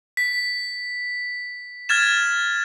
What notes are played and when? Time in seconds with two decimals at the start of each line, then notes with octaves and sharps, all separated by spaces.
0.17 B6
1.89 F6 G#6 A6 E7